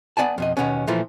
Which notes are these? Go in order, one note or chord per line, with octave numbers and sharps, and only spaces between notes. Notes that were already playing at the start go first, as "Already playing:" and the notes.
B3 D5 G#5 A5
F2 B2 D#5
D#2 B2 B3 C#4
A#2 E3 F3 A3